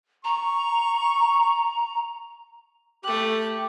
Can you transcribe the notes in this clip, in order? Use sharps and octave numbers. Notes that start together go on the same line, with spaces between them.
A#5 C#6
A3 G4 F#6